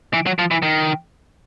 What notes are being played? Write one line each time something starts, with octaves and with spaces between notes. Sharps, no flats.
E3
F#3
F3
E3
D#3